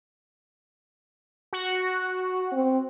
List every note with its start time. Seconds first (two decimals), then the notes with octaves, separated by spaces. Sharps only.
1.53 F#4
2.52 C4